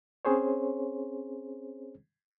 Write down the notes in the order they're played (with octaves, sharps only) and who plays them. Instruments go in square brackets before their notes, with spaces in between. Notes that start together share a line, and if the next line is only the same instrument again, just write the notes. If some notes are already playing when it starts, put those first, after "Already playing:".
[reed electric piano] C4 C#4 G#4 C5 C#5